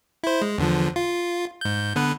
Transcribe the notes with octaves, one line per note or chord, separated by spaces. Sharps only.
E4 C5
G#3
E2 D3 F3
F4
G#2 G6
D3 B3 B4